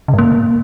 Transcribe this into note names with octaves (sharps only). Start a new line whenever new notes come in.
C#3
G#2
A#3